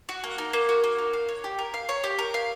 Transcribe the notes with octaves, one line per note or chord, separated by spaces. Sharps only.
F#4
A#3
D#4
A#3
F#4
A#3
D#4
F5
C#5
G4
A#4
F5
C#5
G4
A#4
F5